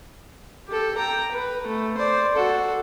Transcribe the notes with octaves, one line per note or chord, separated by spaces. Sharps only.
G4 A4
G5 A#5
B4
A3
C5 D5
F#4 A4